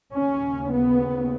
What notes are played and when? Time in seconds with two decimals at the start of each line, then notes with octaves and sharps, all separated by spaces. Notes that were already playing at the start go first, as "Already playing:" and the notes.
0.14 D#2 C#3 C#4
0.73 B3